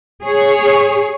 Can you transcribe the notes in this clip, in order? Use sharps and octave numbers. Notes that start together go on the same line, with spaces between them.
G#4 C#5